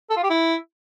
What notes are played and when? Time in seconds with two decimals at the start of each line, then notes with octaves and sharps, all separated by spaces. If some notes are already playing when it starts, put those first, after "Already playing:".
0.10 A4
0.17 F4
0.23 G4
0.30 E4